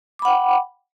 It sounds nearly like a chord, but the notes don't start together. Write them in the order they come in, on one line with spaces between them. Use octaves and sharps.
D6 B5 F#5 G5